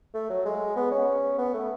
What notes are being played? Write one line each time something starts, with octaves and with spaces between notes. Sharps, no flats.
A3
F#3
G#3
B3
C#4
B3
A3